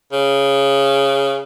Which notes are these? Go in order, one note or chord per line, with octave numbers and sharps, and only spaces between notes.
C#3